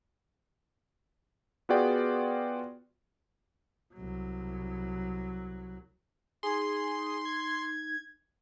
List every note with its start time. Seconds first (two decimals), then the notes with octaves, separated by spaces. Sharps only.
1.69 B3 F4 F#4 G#4 D5 G5
3.94 C2 F#3
6.43 D#4 G#4 C6
7.25 G#6